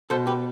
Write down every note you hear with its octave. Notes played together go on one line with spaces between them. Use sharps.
B2 A4 C5
G4 B4